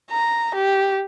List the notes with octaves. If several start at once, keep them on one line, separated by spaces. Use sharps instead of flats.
A#5
G4